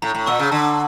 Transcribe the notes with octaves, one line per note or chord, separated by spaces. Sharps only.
A2 A#5
A2
A#2 C#6 E6
C#3
D3 A5